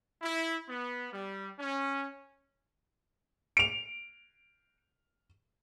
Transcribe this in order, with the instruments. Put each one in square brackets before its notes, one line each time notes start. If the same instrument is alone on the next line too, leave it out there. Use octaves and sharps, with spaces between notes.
[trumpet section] E4
B3
G3
C#4
[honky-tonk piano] D7 F7